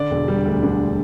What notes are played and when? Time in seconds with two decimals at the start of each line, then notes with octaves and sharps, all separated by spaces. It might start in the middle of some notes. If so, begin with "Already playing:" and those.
Already playing: D3 D5
0.11 E1
0.28 G3
0.45 D2
0.63 D3